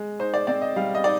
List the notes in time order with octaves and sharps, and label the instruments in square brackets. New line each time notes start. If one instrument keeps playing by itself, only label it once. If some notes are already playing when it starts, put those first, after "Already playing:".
Already playing: [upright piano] G#3
D#4 C5
D5
C4 D5
D#5
G3 F5
D#5
D#4 D5